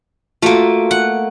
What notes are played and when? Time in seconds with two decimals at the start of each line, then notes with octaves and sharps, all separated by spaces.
0.42 A3 A#3 F4 F#4
0.91 F#5